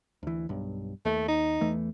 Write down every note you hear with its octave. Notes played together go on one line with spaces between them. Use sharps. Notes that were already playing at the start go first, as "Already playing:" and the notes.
D2 E3
B1 G2
D#2 A3
D#4
E2 E3 A3